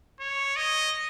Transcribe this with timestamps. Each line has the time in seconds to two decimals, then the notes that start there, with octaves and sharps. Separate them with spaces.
0.20 C#5
0.56 D#5